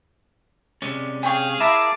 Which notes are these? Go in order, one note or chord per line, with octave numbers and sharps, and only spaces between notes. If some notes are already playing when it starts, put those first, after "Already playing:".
C3 G#3 C#4 D5
G#4 C#5 F5 G5 G#5
E4 A#4 E5 A5 A#5 D6